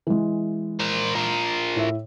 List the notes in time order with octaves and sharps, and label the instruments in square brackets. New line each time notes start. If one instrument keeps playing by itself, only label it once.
[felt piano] E3 G#3
[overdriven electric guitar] A#4 C5
F3 A#4
[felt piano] A2 E5